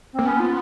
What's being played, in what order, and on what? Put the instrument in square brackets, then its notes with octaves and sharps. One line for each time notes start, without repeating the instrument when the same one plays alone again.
[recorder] C4
[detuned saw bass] A#3
[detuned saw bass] B3 [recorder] C#4
[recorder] F4